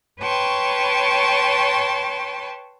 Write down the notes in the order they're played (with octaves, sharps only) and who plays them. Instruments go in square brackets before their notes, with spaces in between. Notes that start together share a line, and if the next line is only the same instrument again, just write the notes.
[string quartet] B4 C#5 G5 A5 C6 C#6